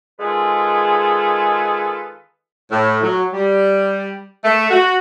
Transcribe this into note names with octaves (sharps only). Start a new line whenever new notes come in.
D#3 G#3 F4 G#4 A4 B4
A2
F#3
G3
A3
F#4